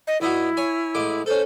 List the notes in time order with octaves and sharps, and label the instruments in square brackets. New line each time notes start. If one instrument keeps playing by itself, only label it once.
[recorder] D#5
[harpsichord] G2 D#4 F#4 [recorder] E4
[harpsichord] C#5 G#5
A1 G#3 D6
[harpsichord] C#4 A4 [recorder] C5